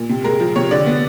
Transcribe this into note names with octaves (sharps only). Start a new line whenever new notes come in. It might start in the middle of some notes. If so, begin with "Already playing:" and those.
Already playing: A#2
C3
G#3 A#4
F3
C3 C#5
D3 D5
B3